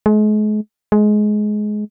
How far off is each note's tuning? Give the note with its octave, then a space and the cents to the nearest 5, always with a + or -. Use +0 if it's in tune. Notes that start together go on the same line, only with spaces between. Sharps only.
G#3 +40
G#3 +20